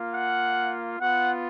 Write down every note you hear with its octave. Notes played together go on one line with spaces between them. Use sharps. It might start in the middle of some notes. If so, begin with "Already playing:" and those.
Already playing: A#3 F4
F#5
B3 F4 F#5